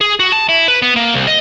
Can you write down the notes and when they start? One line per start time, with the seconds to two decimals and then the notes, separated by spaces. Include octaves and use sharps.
0.01 G#4
0.20 F#4
0.32 A5
0.49 E4
0.68 B4
0.82 B3
0.96 A#3
1.14 C2
1.27 D#5